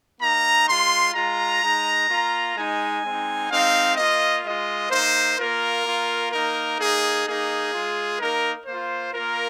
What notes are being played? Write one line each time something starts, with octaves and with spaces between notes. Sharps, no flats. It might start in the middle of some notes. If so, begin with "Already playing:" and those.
A#3 D#4 A#5
G#3 F4 C6
G#3 F4 A#5
G#3 D#4
A#3 F4
G#3 D#4 G#5
G#3 C4 D#4
G#3 C4 D#4 F5
A#3 F4 D#5
G#3 F4 D#5
A#3 D#4 C5
A#3 F4 A#4
A#3 F4
A#3 D#4 A#4
A#3 D#4 G#4
A#3 D#4 G#4
G#3 F4
A#3 D#4 A#4
A#3 F4 C5
A#3 F4 A#4